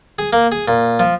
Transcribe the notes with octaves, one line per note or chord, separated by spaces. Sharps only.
G#4
A#3
G#4
A#2
F3